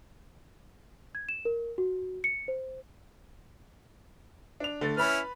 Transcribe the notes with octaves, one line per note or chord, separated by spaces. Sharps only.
G#6
E7
A#4
F#4
C#7
C5
D4 F7
D3 A3 A6
C#4 E4 B4 B5 F6